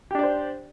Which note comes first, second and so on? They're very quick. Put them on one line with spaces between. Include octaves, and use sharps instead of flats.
G4 D4 D5 C5